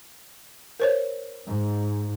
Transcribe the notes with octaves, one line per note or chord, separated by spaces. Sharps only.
A#4 C5 C#5
G#2